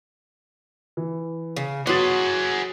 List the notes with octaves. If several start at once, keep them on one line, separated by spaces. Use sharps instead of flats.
E3
C#3
F#3 B3 G#4 F#5 C6 D6 D#6 A6